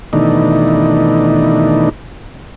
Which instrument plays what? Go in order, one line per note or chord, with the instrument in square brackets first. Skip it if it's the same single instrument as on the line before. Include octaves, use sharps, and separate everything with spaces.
[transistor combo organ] B2 D#3 E3 A3 D4 D#4